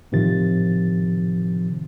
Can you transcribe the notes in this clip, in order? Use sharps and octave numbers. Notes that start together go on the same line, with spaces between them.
A2 C3 D#3 F3 A6